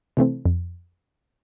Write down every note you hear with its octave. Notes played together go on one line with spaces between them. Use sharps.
C3 E3 A3 C4
F2